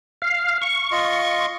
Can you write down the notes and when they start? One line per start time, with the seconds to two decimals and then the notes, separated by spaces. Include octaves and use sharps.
0.22 F5
0.62 C#6
0.92 F4 D#5 C6